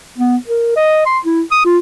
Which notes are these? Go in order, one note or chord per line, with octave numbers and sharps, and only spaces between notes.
B3
A#4
D#5
C6
E4
D#6
F4